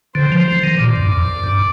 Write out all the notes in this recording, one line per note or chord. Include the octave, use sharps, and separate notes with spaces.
D3 C5
F3
F3
D#3
A#2 D5
G2
F2
G2